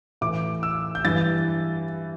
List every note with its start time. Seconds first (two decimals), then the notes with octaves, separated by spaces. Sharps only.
0.21 A2 E3 D6
0.63 E6
0.95 G6
1.04 G2 E3 A6